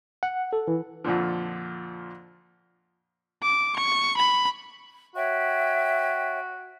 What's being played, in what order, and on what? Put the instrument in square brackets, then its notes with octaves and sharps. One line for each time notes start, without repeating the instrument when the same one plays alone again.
[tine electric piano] F#5
A4
E3
[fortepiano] F2 A#2 D3 F3
[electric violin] D6
C#6
B5
[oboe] F#4 [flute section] C#5 E5 G5